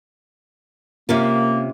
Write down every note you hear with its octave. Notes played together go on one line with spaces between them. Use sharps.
C3 A#3 C#4 F4